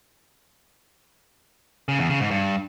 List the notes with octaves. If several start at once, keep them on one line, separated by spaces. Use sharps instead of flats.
C#3
E2
C#3
G#2
G2